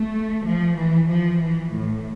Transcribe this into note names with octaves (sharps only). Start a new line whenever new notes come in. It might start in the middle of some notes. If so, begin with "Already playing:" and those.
Already playing: A3
F3
E3
F3
E3
A2